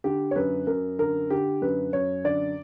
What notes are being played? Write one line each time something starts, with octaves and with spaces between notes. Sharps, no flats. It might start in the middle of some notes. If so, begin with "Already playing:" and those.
D3 G4
C#5
F#2 B4
F#2 A#4
D3 A#4
D3 G4
F#2 B4
F#2 C#5
D3 D5